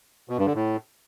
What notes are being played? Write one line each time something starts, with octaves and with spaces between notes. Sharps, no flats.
B2
G2
D3
A2